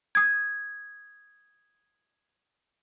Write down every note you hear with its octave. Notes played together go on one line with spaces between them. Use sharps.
D#6 G#6